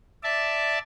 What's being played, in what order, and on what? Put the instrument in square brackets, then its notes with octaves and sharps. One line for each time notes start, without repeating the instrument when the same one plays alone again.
[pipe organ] D5 E5 A5